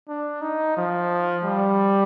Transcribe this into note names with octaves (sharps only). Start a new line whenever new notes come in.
D4
D#4
F3
G3